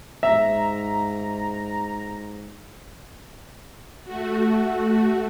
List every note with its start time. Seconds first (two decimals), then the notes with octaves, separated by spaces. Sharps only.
0.23 G#2 E5 A#5
4.03 A3 F#4